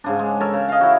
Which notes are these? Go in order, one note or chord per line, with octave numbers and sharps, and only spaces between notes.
G#2 C#3 D4
G#3
A4 A#4 C#5
C#3
D#5 F5
E4 F#4